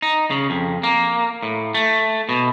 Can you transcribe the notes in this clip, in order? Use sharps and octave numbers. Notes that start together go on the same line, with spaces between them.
D#4
C#3
F2
A#3
A2
A3
B2